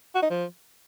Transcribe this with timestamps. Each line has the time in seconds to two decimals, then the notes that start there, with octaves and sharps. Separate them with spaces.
0.15 F#4
0.23 D#4
0.30 F3